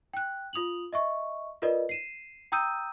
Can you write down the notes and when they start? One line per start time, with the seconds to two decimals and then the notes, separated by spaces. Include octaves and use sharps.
0.13 G5 F#6
0.53 F4 D#6 F7 F#7
0.92 D#5 E5 C#6
1.62 F4 A#4 B4 D5 D#5
1.89 C7 D#7 E7
2.52 G5 A#5 D#6 E6 G6 D#7